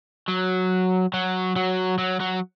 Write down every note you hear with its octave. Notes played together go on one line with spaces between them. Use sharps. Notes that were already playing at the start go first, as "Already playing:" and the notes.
F#3
F#3
F#3
F#3
F#3